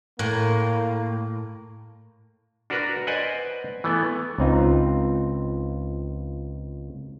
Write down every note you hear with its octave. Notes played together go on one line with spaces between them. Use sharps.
A2 A#3
D4 F#4 A#4 B4
B4 C5 D5 D#5 F#5 G#5
E3 A3 B3
C#2 C4 D#4 F4